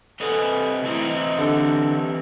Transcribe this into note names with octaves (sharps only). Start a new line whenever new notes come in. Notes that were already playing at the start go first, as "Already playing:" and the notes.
C3 A4 B4 D#5 G#5 B5
E3 A3 C4 D#4 E4
D#5
D3 G4 A4 C#6